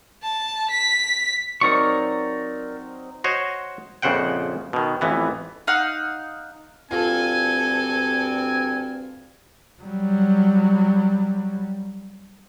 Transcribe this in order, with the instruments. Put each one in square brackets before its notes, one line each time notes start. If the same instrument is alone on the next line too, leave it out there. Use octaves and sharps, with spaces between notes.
[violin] A5
B6
[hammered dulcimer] F#3 C4 D#4 [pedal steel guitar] A#4 D5 C#6
[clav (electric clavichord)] F#4 C5 C#5 D#5
A#1 F2 C#3 C5 F#5 G5
B2 D#3
A1 F2 E3 B3
[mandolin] D#4 F5 F#5
[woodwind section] D2 G2 C4 [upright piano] F4 [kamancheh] A4 [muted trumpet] G#5
[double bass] F#3 G3